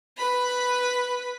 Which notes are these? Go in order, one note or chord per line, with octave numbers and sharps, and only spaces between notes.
B4 B5